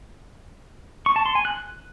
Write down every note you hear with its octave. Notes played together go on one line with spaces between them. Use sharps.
C#6
A5
C6
G#5
F#6